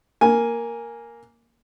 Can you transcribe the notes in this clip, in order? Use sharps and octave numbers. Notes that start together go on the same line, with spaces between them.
A#3 G#5